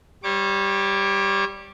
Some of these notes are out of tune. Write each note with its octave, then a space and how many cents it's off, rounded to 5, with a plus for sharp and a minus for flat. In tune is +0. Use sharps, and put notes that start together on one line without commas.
G3 +0 C#5 -35 D6 +0